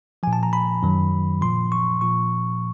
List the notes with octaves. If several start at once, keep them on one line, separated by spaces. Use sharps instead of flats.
A#2 F3 G#5
A5
A#5
B5
F#2 D#3 F#3
A#2 F3 C6
C#6
A#2 F3 C#6